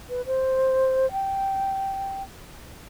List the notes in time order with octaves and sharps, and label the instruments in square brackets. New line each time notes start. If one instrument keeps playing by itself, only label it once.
[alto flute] B4
C5
G5